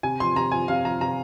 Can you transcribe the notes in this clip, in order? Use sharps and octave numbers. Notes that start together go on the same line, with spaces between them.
C3 G#5
F3 C6
C3 A#5
F3 G#5
C3 F5
F3 A#5
C3 A#5